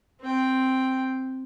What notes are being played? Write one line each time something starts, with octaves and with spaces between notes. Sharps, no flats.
C4 G5